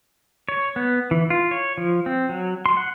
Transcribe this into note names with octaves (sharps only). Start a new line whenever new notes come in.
C#5
B3
E3
F4
C#5
F3
C4
F#3
C6
F#5